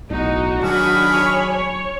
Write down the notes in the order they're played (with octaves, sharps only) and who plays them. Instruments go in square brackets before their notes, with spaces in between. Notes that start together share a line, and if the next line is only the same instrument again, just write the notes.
[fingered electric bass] B1 A2 [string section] D#4 [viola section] F#4
[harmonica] D#3 G#4 F6 [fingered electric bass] F#3 [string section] D4 G#5 B5
[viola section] C#5
C#5